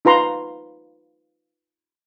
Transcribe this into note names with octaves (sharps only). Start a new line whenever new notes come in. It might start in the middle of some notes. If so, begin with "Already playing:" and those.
D#4 F4 B4 A#5 C6